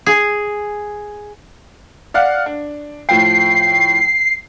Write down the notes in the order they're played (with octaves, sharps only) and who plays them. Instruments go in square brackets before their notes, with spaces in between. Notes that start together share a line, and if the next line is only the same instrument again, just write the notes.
[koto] G#4
[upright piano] D5 F5 F#5
D4
[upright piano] A2 F3 G5 [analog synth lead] C7